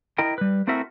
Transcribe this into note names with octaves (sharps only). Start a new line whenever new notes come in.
E4 A#4 D#5 G5
G3 B4
A3 C4 E4 F#4 A#4 E5